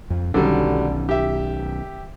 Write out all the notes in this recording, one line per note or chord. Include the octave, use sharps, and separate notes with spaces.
F2
B1 D3 D#3 F#3 G3 C#4
G4 E5